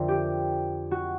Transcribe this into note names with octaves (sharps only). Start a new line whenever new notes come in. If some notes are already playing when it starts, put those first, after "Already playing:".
Already playing: F2 D3 F3 A#4 C5 D5 E5
G4
F#4